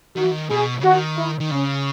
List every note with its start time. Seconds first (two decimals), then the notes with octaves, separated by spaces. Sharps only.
0.16 D#3 F#4
0.24 E3
0.31 D#3
0.50 B2 G#4
0.80 C#3
0.83 D#3 F#4
1.17 E4
1.40 D#3
1.51 C#3 C#4